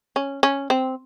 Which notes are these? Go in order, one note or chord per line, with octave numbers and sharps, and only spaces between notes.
C#4
C#4
C4